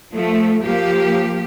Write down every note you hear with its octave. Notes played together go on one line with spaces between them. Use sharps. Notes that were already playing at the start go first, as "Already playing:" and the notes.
F3 A3
F3 A#3 G4